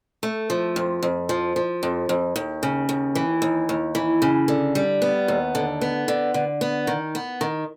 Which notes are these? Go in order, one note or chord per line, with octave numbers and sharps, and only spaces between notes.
A3
F3
F2
F2
F3
F3
F2
F2
D#2
C#3
D#2
E3
D#2
D#2
E3
C#3
D3
G3
B3
D#2
D3
B3
D3
D3
B3
D#3
B3
D#3